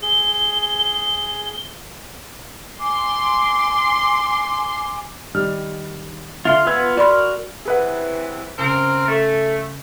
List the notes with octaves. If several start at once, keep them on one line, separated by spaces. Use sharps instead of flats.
G#4 G7
G#5 C6 D6
D#3 G3 F6
D3 F4 E5 F5 C6
B3 F4 B4 E6 G#6
F#4 A#4 D5 B5 C6
C3 E3 G#4 B4 F#5
C#3 C4 A#4
A3